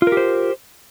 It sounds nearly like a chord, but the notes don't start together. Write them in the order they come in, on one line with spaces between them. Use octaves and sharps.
F4 A#4 G4 C5